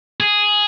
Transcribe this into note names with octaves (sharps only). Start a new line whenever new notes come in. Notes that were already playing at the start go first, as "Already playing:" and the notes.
G#4